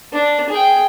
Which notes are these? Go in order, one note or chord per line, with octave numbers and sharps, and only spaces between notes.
D4
G#4 G5